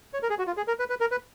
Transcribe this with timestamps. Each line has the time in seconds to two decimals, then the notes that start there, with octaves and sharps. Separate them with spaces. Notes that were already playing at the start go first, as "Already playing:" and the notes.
0.14 C#5
0.23 A#4
0.30 G#4
0.38 F#4
0.47 F4
0.57 G#4
0.68 A#4
0.79 B4
0.90 B4
1.01 A#4
1.11 B4